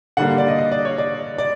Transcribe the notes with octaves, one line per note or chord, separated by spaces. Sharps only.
D3 G3 A#3 F#5
F5
D5
D#5
D#5
D5
C#5
D5
D5